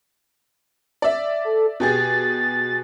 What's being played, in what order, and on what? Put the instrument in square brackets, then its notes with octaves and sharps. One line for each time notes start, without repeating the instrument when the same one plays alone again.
[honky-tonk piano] D5 E5
[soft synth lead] A4
[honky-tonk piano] B2 G4 G#4 [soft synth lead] A6